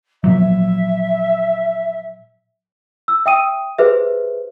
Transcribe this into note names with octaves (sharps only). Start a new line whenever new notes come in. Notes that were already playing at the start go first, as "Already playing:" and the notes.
A#2 F3 F#3 E5
E6
E5 G5 D#6 D#7
G4 G#4 B4 C5 E5